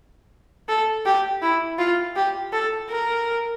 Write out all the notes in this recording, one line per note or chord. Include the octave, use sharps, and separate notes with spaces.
A4
G4
E4
F4
G4
A4
A#4